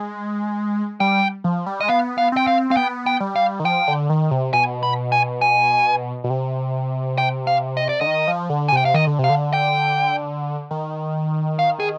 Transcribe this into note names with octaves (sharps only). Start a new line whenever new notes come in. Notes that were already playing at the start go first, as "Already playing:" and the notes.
Already playing: G#3
G3 G5
F3
G3
G#3 D#5
B3 F5
F5
C4 G5
F5
C4 F5
B3 G5
G5
G3
F5
D#3
F3 G5
D3
D#3
C3
B2 G#5
B5
G#5
G#5
B2
C3
G5
F5
D#5
D5
D3 D#5
D#3
F3
D3
G#5
C3 G5
F5
D#3 D#5
D3
C3
F5
D3
G5
D#3
F5
G#4